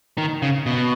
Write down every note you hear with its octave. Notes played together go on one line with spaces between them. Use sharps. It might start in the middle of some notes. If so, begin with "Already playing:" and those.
D#3
C#3
B2